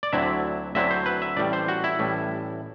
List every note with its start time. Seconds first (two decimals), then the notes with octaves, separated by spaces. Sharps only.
0.03 D5
0.13 D2 D3 F#3 C4 E4 E5
0.75 D2 D3 F#3 C4 E4 E5
0.91 C5
1.06 B4
1.22 E5
1.37 A1 A2 G3 D5
1.53 C5
1.68 F#4
1.84 E4
1.99 A1 A2 G3